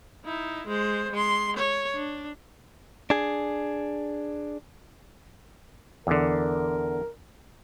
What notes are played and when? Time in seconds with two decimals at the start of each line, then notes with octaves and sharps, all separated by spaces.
0.25 D#4 E4
0.67 G#3 C5
1.12 G#3 C6
1.57 C#5
1.96 D4
3.10 D4 G#4
6.07 E2 D3 A#4